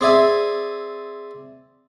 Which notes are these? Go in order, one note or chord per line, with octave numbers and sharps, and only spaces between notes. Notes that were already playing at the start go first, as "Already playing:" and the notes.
C4 G#4 D5 E5 G#5